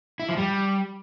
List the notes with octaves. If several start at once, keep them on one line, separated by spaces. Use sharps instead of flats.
E4
F3
G3